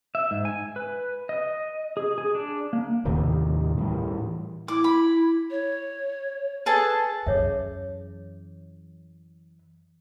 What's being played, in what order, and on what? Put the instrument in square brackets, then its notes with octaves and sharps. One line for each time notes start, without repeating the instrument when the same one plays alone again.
[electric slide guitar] E5
G#2
G#5
B4
D#5
G#4
G#4
D4
A#3
[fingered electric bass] D#2 A2 C3 D#3
A2 E3 G3
[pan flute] E4 [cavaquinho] D6
[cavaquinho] B5
[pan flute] C#5
[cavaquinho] G#4 A4 A5 [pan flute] B4
[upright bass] F#2 E3 [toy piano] G#4 C#5 E5